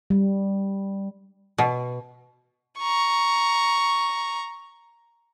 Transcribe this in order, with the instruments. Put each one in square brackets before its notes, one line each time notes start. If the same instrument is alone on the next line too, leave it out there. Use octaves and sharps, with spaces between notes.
[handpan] G3
[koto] B2
[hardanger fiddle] A#5 C#6